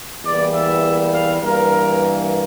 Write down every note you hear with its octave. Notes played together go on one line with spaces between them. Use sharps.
E2 E3 G3 A#3 D5
E5
F5
G2 E3 A#3 A#4